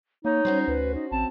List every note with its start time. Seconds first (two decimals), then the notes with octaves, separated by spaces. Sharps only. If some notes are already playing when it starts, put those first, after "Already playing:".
0.25 A#3 D#4 C#5
0.45 G3 C#4 F#4 C5
0.68 D2 B4
0.95 D#4
1.12 A1 C4 A5